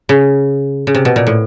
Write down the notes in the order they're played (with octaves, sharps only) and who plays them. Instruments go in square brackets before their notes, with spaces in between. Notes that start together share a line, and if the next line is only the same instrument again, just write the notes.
[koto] C#3
C#3
C3
B2
A#2
A2